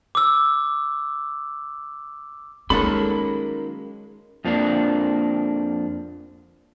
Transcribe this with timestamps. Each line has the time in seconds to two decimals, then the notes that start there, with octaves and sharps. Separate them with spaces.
0.15 D6 E6
2.70 D#3 F#3 G#3 A#3 C#4 A4 B5 F#6
4.44 F2 F3 A#3 D4